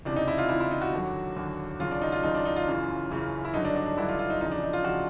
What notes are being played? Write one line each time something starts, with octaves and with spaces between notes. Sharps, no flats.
C#2 C3 E3 D4
D#4
E4
F4
C#2 C3 E3 E4
E4
D#4
F#4
D#2 D3 F#3
D#2 D3 F#3
D#2 C#3 F#3 F4
D4
D#4
F4
D#2 C#3 F#3 D#4
D4
D#4
F4
F#2 C#3 E3
F#2 C#3 E3
E4
G2 D3 F#3 D#4
D4
D4
D4
G2 D3 F#3 E4
F4
F4
D#4
E2 C#3 F3 D#4
D4
D#4
F4
C#3 F3 F#4